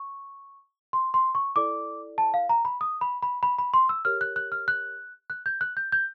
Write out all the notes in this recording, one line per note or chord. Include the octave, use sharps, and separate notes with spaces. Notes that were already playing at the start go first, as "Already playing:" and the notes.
Already playing: C#6
C6
C6
C#6
E4 A4 D5 D6
A5
F5
A#5
B5
D#6
B5
B5
B5
B5
C6
E6
G4 A#4 C#5 F6
F#6
F#6
F6
F#6
F#6
G6
F#6
G6
G6